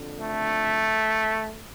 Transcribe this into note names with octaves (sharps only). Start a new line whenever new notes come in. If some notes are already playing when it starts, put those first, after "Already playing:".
Already playing: F2 D3
A3